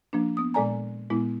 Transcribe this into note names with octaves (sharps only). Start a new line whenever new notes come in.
F3 A#3 D4
B3 D#6
A#2 G#3 A4 D5 G#5 A#5
A#2 G#3 B3 E4